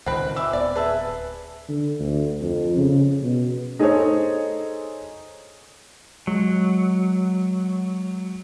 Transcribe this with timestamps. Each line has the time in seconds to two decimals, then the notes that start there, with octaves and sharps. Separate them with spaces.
0.06 C#2 A#2 D#3 C4 B4
0.36 E5 G#5 B5 D6 E6
0.53 D1 B3 D5
0.75 G#4 B4 E5 A5 E6
1.69 D3
2.00 D2
2.41 F2
2.77 C#3
3.23 B2
3.79 D#4 G#4 A4 C5 C#5
6.27 F#3 G#3